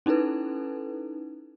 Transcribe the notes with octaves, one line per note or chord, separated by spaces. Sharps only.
C#4 D#4 E4 A4 B4